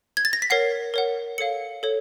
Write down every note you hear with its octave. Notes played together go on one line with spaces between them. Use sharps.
G#6
A6
A#6
B6
A#4 C#5 F#5 C7
A#4 C#5 F#5
A4 C#5 F5 C#7
A4 C#5